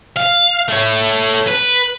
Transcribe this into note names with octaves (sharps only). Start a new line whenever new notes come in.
F5
A3 C#5
B4